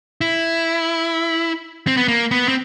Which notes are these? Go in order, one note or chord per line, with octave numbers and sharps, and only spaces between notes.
E4
C4
B3
A#3
B3
C4